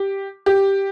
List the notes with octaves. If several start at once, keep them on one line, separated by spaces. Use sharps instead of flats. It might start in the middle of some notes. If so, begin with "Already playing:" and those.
Already playing: G4
G4